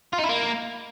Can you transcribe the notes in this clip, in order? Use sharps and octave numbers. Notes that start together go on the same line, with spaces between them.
F4
D#4
E4
A#3